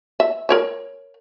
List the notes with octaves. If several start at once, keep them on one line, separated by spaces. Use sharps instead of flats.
E5
A#4 C#5 E5